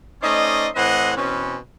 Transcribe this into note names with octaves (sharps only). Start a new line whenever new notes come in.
A3 C#4 D#4 C5 D5 D#5
A2 E3 C4 C5 D#5 F#5
B2 E3 C4 C#4